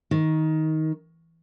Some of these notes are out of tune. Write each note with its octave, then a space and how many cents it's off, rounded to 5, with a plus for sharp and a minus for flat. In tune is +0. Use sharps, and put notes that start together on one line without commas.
D#3 +15